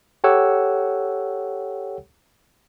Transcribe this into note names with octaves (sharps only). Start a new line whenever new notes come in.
G4 A4 C#5 F#5 G5 E6